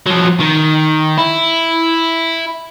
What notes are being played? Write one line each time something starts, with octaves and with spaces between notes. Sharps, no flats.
F3 F#3
D#3
E4